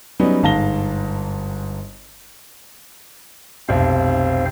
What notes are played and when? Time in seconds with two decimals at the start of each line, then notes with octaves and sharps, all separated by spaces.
0.20 F#3 G3 B3 C#4 D#4
0.43 G1 G#2 F5 A5 A#6 G7
3.69 F1 B1 C4 C5 F5